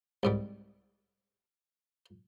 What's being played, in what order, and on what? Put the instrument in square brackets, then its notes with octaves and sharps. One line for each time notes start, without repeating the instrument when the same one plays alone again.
[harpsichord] C2 G#2 G3